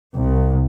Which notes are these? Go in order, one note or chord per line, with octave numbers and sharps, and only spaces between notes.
C2